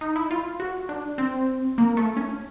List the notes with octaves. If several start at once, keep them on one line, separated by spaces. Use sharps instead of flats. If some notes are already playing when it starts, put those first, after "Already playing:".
D#4
E4
F4
F#4
D4
C4
A#3
A3
C#4